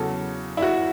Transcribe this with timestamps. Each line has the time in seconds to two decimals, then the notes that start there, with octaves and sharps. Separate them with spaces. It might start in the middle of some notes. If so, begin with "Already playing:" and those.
Already playing: E2 C#3 F#3 A4
0.57 E4
0.62 F#4